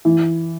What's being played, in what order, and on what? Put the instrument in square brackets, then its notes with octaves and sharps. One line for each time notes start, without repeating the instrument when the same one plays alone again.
[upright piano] E3